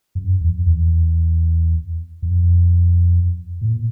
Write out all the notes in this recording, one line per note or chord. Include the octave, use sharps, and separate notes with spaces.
F#2
E2
F2
E2
F2
A2
A#2